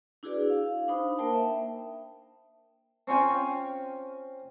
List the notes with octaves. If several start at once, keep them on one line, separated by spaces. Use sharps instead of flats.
D4 E4 F#4 G#4 B4 D5
F5
D4 D#4 C5 B5 D#6
A#3 A#4 C5 G5 A5
E5
C4 C#4 F4 G5 G#5